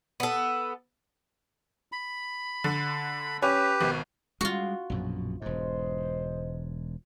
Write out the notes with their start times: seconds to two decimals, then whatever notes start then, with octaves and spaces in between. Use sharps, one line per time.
0.20 B3 A4
1.92 B5
2.64 D3
3.42 C#4 G4 B4
3.81 G#1 B2
4.41 G3 G#3 F4 F#4
4.90 A#1 F#2 B2
5.42 E1 G#2 C5 D#5